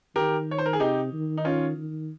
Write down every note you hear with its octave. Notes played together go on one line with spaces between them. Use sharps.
D#3 G4 A#4
C#5
C5
A#4
G#4
C3 D#4 G4
D#3
D#4
C#4 F4
D#3